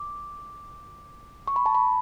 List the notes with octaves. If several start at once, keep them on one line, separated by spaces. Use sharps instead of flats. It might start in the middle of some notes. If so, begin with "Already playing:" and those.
Already playing: D6
C#6
B5
A5
B5